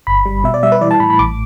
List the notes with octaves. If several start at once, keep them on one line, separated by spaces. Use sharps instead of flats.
G1 B5
G3
B2 E5
D5
G3 E5
B4
E3 D5
A5
A2 B5
B5
A1 D6